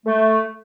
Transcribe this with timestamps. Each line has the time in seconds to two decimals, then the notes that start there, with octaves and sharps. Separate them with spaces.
0.06 A3